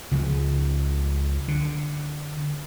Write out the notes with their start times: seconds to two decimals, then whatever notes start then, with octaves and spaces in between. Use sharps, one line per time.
0.11 C#2 C#3 F3
1.48 D3